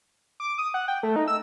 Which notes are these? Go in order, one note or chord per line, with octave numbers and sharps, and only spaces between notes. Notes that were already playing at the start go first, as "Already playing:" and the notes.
D6
D#6
F#5
G5
A3
D#4
E6